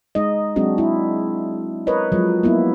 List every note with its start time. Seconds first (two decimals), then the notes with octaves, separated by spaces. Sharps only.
0.15 G#3 D#4 D#5
0.56 F#3 G#3 C4 D4 F#4
0.78 E4
1.87 A#4 B4 C#5 D#5
2.12 F3 F#3 G#3
2.43 A#3 B3 E4